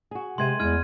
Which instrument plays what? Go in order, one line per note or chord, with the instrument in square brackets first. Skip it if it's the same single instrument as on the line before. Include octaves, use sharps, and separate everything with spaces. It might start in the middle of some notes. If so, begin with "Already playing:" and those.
[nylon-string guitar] F#4 G#4
[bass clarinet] C3 [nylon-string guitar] G#3 C4 C5 [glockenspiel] C6 G#6 D#7
[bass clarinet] E2 [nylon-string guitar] G#3 E4 [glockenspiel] F6 G#6 D#7